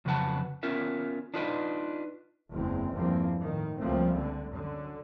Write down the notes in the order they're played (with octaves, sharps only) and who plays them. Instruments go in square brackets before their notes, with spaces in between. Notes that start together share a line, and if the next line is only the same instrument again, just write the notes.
[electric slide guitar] F2 C#3 F#3 B4 F#5 A5
B3 C#4 F4 A#4 E5
D4 D#4 F4 B4 C#5 D#5
[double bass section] F#1 E2 G#3 C4
E2 G2 F3 A#3 C4
A2 D#3
C#2 F3 G3 A3 A#3 C4
D3
F#2 D3